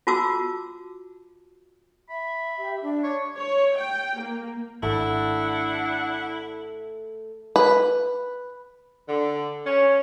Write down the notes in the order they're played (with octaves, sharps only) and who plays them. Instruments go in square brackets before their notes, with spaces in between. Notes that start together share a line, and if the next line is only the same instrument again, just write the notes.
[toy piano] F4 F#4 A5 D6 E6
[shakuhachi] E5 [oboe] B5
[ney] G4
D4
[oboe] C#5
[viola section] C#5
G5
A#3
[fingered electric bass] G#1 [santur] A3 [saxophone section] D4 F#5 [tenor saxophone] E4
[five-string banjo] B4
[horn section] D3
C#4